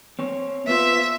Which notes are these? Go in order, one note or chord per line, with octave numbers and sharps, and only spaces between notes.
C4 C#5
B3 F4 C5 E5